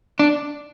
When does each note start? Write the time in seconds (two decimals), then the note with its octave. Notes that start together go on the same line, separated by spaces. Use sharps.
0.19 D4